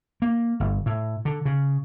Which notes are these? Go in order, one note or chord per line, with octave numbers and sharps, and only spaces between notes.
A#3
G1
A2
D3
C#3